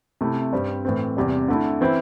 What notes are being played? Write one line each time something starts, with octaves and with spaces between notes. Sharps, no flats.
C3 A3 E4
G2 G3 C4
A2 E3 C4
E2 C3 G3
D3 A3 E4
E3 C4 E4